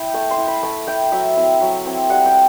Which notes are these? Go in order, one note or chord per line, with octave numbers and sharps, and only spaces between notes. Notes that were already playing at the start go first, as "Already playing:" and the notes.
Already playing: E4 G5
A3 A5
C6
E4
B5
A3 A5
E4 G5
F#3 E5
C4 E4
F#3
C4 E4
G3 F#5
G5